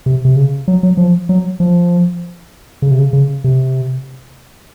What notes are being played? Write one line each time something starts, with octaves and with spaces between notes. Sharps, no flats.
C3
C3
C#3
F#3
F#3
F3
F#3
F3
C#3
C3
C#3
C#3
C3